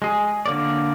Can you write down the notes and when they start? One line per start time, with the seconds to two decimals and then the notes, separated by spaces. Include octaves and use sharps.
0.02 G#3 G#4
0.46 D3 A#3 D5